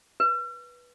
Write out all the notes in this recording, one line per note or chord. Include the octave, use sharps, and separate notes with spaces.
B4